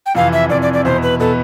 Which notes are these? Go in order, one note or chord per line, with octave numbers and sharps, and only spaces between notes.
G5
F2 C3 E3 F5
E5
F2 C3 E3 D5
D5
D5
E2 B2 B3 C5
B4
B2 B3 A4